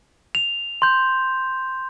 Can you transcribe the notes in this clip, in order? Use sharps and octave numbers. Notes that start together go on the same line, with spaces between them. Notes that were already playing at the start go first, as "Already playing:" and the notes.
F7
C6 G6